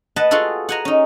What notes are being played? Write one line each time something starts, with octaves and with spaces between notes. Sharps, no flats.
B4 D#5 F#5 A5
F4 F#4 G#4 A4 F#5
F#5 G#5 A#5
C#4 D#4